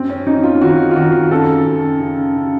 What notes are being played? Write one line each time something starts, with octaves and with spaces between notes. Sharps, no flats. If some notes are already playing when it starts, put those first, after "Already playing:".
Already playing: F#2 C4
C#4
F#2 D#4
F4
D#3 F#4
F4
D#3 F#4
F#2 A4
F#2
C#3
C#3